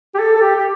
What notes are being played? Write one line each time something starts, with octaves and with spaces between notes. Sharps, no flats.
G4
A4
A4
G4
G4